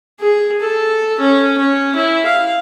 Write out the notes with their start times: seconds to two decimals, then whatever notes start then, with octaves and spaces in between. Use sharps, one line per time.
0.20 G#4
0.61 A4
1.19 C#4
1.58 C#4
1.95 E4
2.26 F5